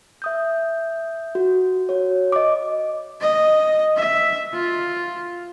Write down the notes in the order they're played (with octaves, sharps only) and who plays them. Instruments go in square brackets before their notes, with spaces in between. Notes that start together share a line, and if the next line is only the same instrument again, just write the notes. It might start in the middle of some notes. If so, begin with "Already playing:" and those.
[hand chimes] E5 D#6 G6
F#4
F#4 C#5
D#5 D6
[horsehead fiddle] D#5
E5
F4